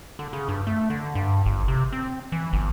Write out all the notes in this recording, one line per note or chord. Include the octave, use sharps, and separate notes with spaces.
D3
C#3
G2
A3
D3
G2
G1
C3
C4
E3
G1